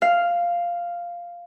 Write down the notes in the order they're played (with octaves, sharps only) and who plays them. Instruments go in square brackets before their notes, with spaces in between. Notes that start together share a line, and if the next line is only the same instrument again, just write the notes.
[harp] F5